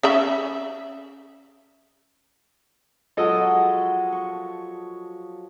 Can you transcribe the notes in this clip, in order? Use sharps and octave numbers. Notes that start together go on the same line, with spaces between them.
C#4 E5 B5
F3 F#3 G#3 F#4 A4 D#5
C#6